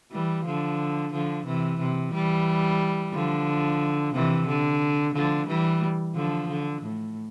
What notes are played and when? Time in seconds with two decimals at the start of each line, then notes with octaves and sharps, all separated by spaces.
0.12 E3 G3
0.46 D3 F3
1.13 D3 F3
1.46 C3 E3
1.80 C3
2.13 E3 G3
3.13 D3 F3
4.14 C3 E3
4.47 D3
5.15 D3 F3
5.48 E3 G3
6.15 D3 F3
6.48 D3
6.82 A2